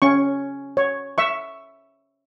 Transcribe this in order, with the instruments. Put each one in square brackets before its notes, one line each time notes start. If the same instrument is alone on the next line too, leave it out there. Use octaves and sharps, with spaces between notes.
[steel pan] C#4 C#6
C#5
E5 C#6